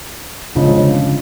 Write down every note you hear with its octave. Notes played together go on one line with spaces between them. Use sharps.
G1 F2 C#3 F3 G#3